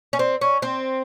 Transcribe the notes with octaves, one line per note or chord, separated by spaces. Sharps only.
C#4
C4
C#4
C4